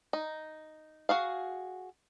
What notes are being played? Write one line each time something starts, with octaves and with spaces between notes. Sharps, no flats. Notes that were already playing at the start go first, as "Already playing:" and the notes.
D#4
F#4 G#4 F5